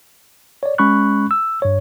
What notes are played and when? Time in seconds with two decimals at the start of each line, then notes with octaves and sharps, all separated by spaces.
0.63 C#5 D5
0.78 G#3 C#4 B5 C#6 F#6
1.31 E6
1.62 G2 C#5